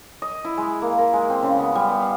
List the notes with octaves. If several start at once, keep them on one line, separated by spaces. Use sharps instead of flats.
D#5
E4
G#3
A#3
A#4
G#3
C4
C#3
B3
G3
B3
F5